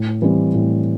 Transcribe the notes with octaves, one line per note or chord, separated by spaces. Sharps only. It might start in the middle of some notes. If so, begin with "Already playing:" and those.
Already playing: A2
E3 G3 C4 G4
A2